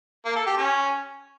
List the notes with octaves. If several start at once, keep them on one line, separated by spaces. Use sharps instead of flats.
A#3
A4
G4
C#4